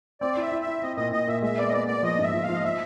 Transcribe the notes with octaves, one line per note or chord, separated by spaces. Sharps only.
C4 D5
E4
E5
E4
E5
E4
C4 D#5
A#2 D#5
A#2 D#5
A#2 E5
G#3 E5
B3 D5
D#5
B3 D5
B3 D5
F3 D#5
G#2 E5
F3
F5
F3
D#5
F3 E5